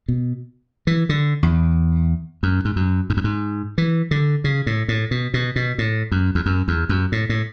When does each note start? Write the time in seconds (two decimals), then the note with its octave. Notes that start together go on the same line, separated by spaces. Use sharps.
0.08 B2
0.87 E3
1.09 D3
1.43 E2
2.43 F#2
2.65 G#2
2.76 F#2
3.10 G#2
3.17 F#2
3.24 G#2
3.78 E3
4.11 D3
4.44 C#3
4.66 A2
4.88 A2
5.11 B2
5.34 B2
5.56 B2
5.78 A2
6.12 F#2
6.35 E2
6.46 F#2
6.68 E2
6.89 F#2
7.12 A2
7.29 A2